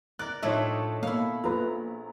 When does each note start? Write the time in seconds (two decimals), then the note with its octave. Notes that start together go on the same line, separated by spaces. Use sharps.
0.19 A#4 D5 F#6
0.42 A2 F3 A3 D4 D#4 C#5 E5
1.03 B2 A#3 E4 F5
1.44 A#1 F4 A4 B4 A#5